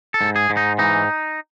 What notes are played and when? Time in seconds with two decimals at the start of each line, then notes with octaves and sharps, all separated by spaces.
0.14 A4
0.21 G#2
0.36 G#4
0.50 G#2
0.57 D#4
0.79 E3 D#4